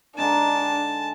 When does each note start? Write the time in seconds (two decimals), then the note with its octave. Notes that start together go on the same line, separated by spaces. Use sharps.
0.18 D3 G#3 D4 D#4 A5